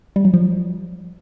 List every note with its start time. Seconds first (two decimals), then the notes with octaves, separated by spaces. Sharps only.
0.16 G3
0.25 F#3
0.34 F3